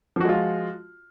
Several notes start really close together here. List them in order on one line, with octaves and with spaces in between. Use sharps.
F3 F#4 G#3 F4